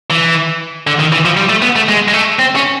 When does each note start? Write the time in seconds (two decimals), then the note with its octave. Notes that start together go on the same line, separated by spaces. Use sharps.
0.10 E3
0.87 D3
0.99 D#3
1.12 E3
1.25 F3
1.37 G3
1.49 A3
1.62 B3
1.76 A3
1.89 G#3
2.08 G#3
2.13 A3
2.39 C4
2.55 C#4